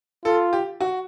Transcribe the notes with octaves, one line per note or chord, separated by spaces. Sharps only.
F4 A4
G4
F#4